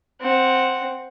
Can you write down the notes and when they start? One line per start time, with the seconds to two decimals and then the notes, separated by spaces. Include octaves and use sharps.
0.21 C4 F#5